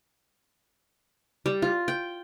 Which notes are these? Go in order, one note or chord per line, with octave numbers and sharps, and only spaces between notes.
G3
F4
G5